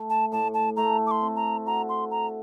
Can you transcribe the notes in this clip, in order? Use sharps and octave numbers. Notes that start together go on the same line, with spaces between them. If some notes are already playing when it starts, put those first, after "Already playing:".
Already playing: A3
A5
A2 A5
A5
A3 A#5
D6
C6
C4
A#5
F#4 A#5
C6
C4 A#5